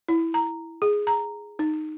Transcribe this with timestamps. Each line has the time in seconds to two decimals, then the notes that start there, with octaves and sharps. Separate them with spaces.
0.09 E4
0.34 A#5
0.82 G#4
1.07 A#5
1.59 D#4